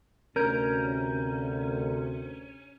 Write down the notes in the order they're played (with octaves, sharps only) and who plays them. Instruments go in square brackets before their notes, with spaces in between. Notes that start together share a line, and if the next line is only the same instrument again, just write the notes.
[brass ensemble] D2 C3 [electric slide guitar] C#4 [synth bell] A#4 A#5 G6